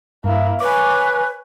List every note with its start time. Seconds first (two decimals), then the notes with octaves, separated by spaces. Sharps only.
0.24 G2 A#3 E4
0.60 B4 C#5 G#5 D6